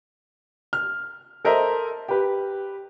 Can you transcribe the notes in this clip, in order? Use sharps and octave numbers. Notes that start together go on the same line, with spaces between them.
F6
A4 A#4 C5 D#5 E5 A#5
G4 B4